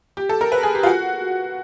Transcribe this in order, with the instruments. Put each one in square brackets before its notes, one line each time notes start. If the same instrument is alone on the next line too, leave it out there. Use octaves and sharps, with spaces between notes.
[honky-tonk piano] G4
A4
A#4
B4
G#4
G4
F4
F#4